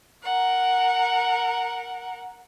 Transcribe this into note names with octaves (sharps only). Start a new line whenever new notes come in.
A#4 F#5